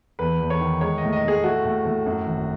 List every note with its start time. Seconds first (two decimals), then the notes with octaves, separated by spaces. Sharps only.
0.19 E2 B4
0.40 E2
0.50 C#5
0.61 D#3
0.81 G#3 C#5
0.98 D#5
1.03 A2
1.13 D#5
1.23 A2 G#4
1.44 A3 F#4
1.65 A2
1.85 A2
2.06 F#2
2.27 G#1